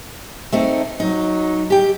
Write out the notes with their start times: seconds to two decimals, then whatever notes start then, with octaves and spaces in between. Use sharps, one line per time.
0.52 A3 C4 D#4
1.00 F#3 D#4
1.70 G4 G5